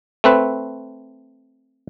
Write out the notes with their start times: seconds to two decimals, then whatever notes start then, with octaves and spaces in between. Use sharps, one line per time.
0.24 A3 C4 B4